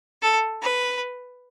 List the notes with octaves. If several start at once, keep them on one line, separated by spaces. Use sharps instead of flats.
A4
B4